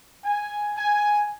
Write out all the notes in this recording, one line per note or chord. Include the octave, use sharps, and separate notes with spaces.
G#5
G#5